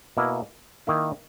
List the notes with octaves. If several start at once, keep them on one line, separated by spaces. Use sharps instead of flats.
B2 A#3 E4
D#3 A#3 E4